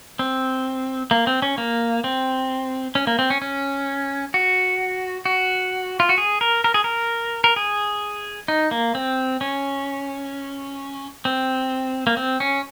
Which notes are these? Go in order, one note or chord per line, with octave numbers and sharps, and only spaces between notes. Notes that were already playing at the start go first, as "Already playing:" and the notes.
C4
A#3
C4
C#4
A#3
C4
C#4
A#3
C4
C#4
C#4
F#4
F#4
F4
F#4
G#4
A#4
A#4
G#4
A#4
A#4
G#4
D#4
A#3
C4
C#4
C4
A#3
C4
C#4